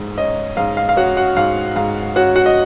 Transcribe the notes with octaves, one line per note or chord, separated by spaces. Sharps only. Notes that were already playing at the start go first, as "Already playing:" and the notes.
Already playing: G#2
C#4 D#5
G#2 F5
F5
F5
C#4 F#4 F#5
F#4 F#5
G#2 F5
G#2 F5
C#4 F#4 F#5
F#4 F#5
D#5